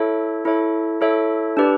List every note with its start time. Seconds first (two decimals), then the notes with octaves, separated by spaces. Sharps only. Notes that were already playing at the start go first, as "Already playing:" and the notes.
Already playing: E4 A4 C#5 E5
0.45 E4 A4 C#5 E5
1.01 E4 A4 C#5 E5
1.57 D4 G4 B4 D5